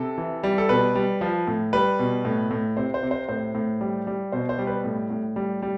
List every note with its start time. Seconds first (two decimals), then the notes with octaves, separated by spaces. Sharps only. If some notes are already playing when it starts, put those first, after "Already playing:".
Already playing: C3 A4
0.18 E3
0.43 G3
0.58 A4
0.69 B2 B4
0.95 G3
1.21 F3
1.47 A2
1.73 G3 B4
1.99 B2
2.25 A2
2.51 A2
2.77 C3 C5
2.94 C5
3.03 C3
3.11 C5
3.29 A2 C5
3.55 A2
3.81 G3
4.07 G3
4.32 B2 C5
4.49 C5
4.59 G3
4.67 B4
4.84 A2
5.10 A2
5.36 G3
5.62 G3